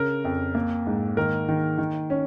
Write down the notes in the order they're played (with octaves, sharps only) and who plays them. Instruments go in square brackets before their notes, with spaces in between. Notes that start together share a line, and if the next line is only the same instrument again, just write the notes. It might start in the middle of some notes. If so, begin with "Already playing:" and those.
Already playing: [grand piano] C#3 C#4 A#4
F2
A#3
G#2
D#3 A#4
D#3
D#3
C#4